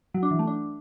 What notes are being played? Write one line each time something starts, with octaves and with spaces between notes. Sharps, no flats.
F#3
D4
E3
A3
D4